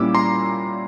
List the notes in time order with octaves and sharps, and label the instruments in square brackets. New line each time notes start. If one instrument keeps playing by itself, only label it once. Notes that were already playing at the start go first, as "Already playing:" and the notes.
Already playing: [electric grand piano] A#2 G3 A#3 C#4 E4 D6 E6
A#5 C6